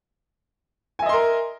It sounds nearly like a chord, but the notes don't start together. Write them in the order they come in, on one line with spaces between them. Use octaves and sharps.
G#5 E5 D#5 C6 A#4